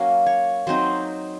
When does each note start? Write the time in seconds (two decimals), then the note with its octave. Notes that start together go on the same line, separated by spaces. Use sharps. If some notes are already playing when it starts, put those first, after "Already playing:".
Already playing: F#3 A#3 C#4 F5
0.26 C#5
0.67 F#3 C4 D#4 C5